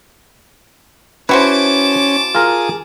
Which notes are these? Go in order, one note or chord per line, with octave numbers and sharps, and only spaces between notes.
C#4 E4 F#4 B4 C5 A5 D6
F4 G#4 A#4